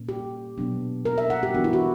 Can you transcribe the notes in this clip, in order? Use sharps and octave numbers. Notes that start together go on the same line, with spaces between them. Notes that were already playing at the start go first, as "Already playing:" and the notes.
Already playing: A#2 A#3 C#4
G4
B2 F#3 B3 D4
A#4
E5
F#5
G4
E3 B3 D4 F#4
E4
F#4